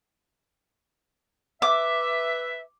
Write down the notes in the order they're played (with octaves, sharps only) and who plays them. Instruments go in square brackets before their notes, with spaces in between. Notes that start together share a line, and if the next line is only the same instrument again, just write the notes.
[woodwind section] B4 E5 [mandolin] D6